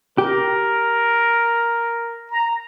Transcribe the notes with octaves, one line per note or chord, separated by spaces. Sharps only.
G4 A#4
A#5